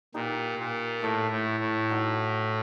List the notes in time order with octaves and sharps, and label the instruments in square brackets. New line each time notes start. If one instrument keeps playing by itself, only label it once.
[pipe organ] A#2 [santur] D#4 G4 B4
[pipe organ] A#2
[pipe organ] A2 [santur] E4 A4 C#5 F5
[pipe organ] A2
A2
[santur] D#4 F#4 B4